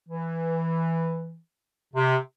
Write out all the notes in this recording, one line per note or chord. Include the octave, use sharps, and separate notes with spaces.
E3
C3